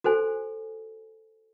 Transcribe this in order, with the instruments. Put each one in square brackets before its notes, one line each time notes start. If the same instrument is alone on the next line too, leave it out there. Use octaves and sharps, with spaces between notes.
[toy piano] F#4 A4 C5 G#5